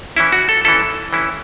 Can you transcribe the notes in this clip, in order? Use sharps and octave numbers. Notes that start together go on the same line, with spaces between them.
E3 C#4 E4
F#4
A4
E3 C#4 E4 A4
E3 C#4 E4